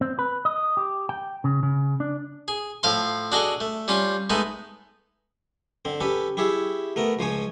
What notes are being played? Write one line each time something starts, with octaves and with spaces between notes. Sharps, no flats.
C4
B4
D#5
G4
G5
C#3
C#3
D4
G#4
A2 F3 F5 C6
D4 F#4 G#4 A4 D#5
A3
G3 C#4 F4
G#3 A3 B3 D#4
D3 C4
C#4 G4 A4 B4
E4 G4 G#4 C#5 E5
A3 B3 A#4
C#2 F3 C5 C#5 G#5